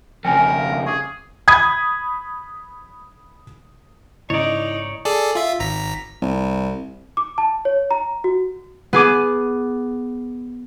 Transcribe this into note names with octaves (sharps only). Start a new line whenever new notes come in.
F2 C#3 A#4 G5 G#5
F5
G#4 C#6 D6
B5 D#6 G#6
G#2 C#3 D#4 E4 C#5 D5
G#4 A4 D5
F4 E5
G#1 A#5 B6
C2
D6
A5
C#5
A#5
F#4
B3 G#4 D6 D#7